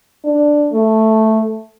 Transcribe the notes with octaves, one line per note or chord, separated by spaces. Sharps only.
D4
A3